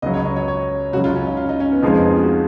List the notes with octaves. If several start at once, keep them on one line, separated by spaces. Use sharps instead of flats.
C#2 C#3 F#3 D#5
C#5
D#5
C#5
C#5
C#2 C#3 F#3 F#4
F4
C#4
D#4
F4
D#4
C#4
B3
F2 F3 G#3 C#4 D#4
B3
C#4
F4
F#4
F4